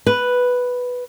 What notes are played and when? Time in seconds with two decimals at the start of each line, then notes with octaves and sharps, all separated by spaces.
0.06 B4